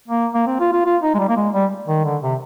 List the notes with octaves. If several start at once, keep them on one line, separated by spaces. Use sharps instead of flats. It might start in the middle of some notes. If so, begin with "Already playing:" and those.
A#3
A#3
C4
F4
F4
F4
D#4
G#3
G3
A#3
G#3
G3
D#3
D3
C3